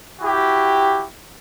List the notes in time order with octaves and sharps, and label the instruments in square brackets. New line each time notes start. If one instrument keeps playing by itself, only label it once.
[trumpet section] E4 F#4 G4